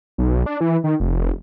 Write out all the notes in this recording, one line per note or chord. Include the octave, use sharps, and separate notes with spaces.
B1
D4
E3
D#3
F1